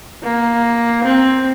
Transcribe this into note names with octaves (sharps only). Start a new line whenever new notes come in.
A#3
C4